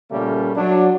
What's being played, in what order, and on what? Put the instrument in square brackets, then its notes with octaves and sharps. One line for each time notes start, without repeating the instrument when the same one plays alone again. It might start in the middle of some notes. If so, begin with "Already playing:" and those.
[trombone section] A#2 C#3 G3 A3 A#3 C#4
F#3 D4